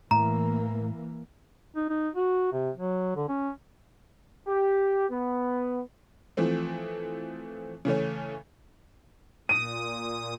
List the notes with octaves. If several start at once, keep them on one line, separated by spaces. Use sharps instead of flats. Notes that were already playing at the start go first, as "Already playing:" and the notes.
A2 E3 A#3 A#5
D#4
D#4
F#4
C3
F#3
D3
C#4
G4
B3
E3 F3 A3 C4
C#3 E3 A3 C#4
A#2 D#6 D#7